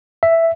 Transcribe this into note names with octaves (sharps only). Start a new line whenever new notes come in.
E5